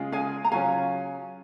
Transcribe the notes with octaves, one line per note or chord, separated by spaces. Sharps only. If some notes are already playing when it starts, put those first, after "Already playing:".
Already playing: C#3 G#3 C#4 F4
F5 G#5
A#5
C#3 F#3 C#4 F4 F5 G#5